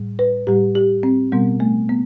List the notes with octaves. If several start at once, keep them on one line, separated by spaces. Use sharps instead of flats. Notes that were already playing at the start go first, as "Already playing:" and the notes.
Already playing: A2 G3
B4
A2 G3 G4
G4
C4
B2 G3 B3
A3
B3